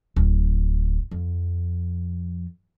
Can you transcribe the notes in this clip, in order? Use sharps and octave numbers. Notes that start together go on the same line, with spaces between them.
D1
F2